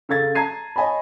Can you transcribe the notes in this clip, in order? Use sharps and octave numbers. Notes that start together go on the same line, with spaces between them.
C#3 A4 F5 G#6 A6
A5 A#5 G#6 C7 D#7
C#5 D#5 G#5 A5 B5